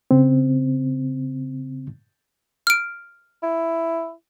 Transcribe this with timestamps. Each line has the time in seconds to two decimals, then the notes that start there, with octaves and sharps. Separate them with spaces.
0.11 C#3 C4
2.67 F6 D7
3.43 E4